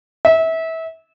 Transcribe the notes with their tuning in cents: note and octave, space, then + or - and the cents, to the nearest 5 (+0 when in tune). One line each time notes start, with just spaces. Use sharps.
E5 -25